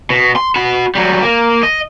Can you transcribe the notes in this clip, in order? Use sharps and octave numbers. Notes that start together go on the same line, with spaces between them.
B2
C6
F#4 B5
F#3 G3
A#3
D#5